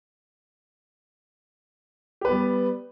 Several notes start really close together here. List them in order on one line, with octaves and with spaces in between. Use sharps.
G4 B4 B3 G3